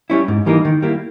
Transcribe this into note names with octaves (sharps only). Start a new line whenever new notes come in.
G3 C#4 E4
G#2
E3 G3 A#3 D#4
D#3
G3 A#3 E4